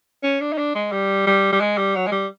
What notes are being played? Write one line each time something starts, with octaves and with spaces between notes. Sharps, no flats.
C#4
D4
D#4
D4
G#3
G3
G3
G3
G#3
G3
F#3
G#3
G3